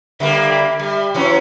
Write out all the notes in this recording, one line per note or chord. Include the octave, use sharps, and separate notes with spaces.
D3 G3 A#3 E5
G3
E3 F#3 C#4